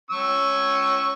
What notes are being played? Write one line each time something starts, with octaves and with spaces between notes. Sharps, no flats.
C#4 C#6 E6